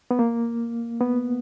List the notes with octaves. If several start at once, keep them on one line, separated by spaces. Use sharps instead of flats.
B3
A#3
B3